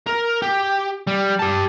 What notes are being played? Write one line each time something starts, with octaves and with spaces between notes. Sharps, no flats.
A#4
G4
G3
G4 A5